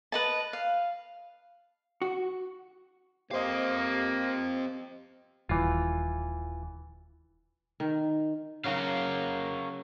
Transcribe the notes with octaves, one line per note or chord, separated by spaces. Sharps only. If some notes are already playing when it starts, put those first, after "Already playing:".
B4 D#5 A5
F5
F#4
A#3 C4 G4 C5 D#5 F5
D#1 E3 F4
D#3
C#3 F#3 F#4 A#4 C#5 F5